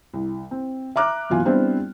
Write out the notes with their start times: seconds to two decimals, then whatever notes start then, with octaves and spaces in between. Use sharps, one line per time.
0.14 C2
0.51 C4
0.96 E5 A#5 D6 F6 F#6
1.30 F#1 B2 E3 F4 F5 G#5
1.45 G3 B3 C4 D4 E4 C5